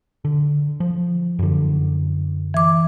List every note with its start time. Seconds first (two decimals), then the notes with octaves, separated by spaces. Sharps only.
0.25 D3
0.80 F3
1.39 F#2 D3
2.54 E3 D6